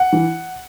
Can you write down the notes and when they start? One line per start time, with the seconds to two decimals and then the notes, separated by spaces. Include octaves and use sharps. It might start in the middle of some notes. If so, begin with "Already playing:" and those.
Already playing: F#5
0.12 E3